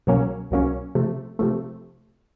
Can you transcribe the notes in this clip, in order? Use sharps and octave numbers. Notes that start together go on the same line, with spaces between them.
C2 B2 F#3 A#3 C#4
C2 B2 F#3 A#3 C#4
C3 F3 A3
C3 F3 A3